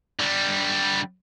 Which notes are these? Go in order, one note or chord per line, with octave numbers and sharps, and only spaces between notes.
D3 G3